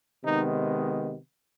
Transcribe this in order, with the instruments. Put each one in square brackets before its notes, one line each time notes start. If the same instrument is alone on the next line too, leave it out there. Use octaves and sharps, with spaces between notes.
[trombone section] C3 D#3 G#3 B3 D#4